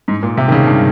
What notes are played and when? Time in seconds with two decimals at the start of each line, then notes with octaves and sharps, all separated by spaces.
0.08 G#2
0.23 A#2
0.38 C3
0.48 D#3
0.52 C#3
0.67 G2